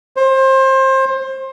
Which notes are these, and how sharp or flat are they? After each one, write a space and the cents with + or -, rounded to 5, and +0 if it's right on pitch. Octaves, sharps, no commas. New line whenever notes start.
C5 +25